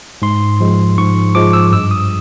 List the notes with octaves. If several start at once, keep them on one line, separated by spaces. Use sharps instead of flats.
G#2 C6
F3 G#3
G#2 C#6
F3 G#3 D6
E6
G2 E6
D#6